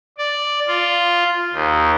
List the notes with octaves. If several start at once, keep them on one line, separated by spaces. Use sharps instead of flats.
D5
F4
D#2